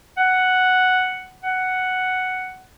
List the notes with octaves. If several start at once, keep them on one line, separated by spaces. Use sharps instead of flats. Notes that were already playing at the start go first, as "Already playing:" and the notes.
F#5
F#5